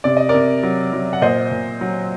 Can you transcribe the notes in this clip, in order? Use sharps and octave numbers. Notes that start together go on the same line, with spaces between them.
C3 D5
D#5
A#4 D5
C3
F#3
F#3
F#5
A#2 C5 D#5
A#2
F#3